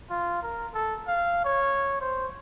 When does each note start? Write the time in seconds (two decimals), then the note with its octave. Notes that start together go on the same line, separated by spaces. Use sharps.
0.10 F4
0.43 A#4
0.74 A4
1.07 F5
1.44 C#5
2.01 C5